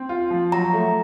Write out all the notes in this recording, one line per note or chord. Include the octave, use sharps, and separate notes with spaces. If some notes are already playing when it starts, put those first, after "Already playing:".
Already playing: C4
F4
F3
F#3 A#5
A3